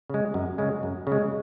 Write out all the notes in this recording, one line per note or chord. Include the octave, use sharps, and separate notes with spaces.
C#3 G#3
F#2
C#3 G#3
F#2
C#3
G#3